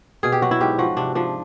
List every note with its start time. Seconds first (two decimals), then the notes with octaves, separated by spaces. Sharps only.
0.23 B2 G#4
0.32 G4
0.42 F#3 F#4
0.51 E4
0.60 G#2 G4
0.79 F3 F#4
0.97 C3 D4
1.15 F3 D4